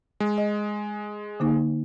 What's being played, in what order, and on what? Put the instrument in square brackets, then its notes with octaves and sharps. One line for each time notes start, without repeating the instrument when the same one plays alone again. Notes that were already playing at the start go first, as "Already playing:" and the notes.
[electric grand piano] G#3
[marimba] D#5
D3 A#3 D#4